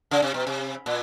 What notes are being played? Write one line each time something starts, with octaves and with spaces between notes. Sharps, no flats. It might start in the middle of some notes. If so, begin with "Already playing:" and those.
C#3
C3
B2
C3
A#2